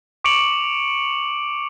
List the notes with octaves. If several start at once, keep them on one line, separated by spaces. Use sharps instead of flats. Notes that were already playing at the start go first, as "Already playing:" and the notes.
C#6 D6 C#7 D7 F7 F#7